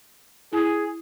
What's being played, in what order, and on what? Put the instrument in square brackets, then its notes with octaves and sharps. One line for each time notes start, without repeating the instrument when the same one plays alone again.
[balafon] E4 [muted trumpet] G#4